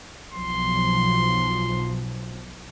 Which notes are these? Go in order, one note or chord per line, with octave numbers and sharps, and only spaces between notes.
B1 F3 C6